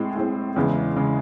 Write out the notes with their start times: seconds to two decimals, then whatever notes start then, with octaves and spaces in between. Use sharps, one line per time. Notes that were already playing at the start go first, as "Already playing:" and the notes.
Already playing: A2 G#3 C4
0.15 A2 G#3 C4
0.56 E2 C#3 G#3
0.96 C#3 G#3